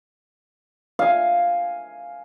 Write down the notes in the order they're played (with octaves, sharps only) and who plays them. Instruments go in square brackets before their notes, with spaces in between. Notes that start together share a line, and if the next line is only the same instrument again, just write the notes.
[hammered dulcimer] F5 G#5